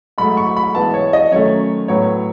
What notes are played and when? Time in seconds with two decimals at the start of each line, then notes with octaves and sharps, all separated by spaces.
0.18 G#2 F#3 A3 B5
0.37 C#6
0.57 B5
0.75 G#2 E3 B3 A5
0.94 C#5
1.13 D#5
1.32 F#2 D#3 A3 C#5
1.88 A2 F#3 B3 C#5